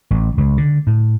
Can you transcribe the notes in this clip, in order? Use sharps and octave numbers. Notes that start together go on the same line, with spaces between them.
A1
C#2
D3
A2